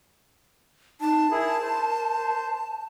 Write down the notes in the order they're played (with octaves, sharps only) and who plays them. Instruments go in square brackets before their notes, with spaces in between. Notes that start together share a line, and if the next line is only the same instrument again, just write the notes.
[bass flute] D#4 [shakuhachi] A5
[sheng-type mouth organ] E4 G#4 [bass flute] A#4
[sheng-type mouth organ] C5